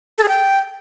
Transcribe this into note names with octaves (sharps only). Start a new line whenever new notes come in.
A4
G#4
G5